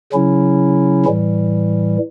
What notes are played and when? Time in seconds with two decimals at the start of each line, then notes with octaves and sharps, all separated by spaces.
0.13 C#3 F#3 C#4 E4
1.05 A2 E3 G3